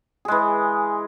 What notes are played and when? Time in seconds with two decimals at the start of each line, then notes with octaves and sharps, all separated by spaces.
0.25 G#4
0.28 G#3
0.32 E3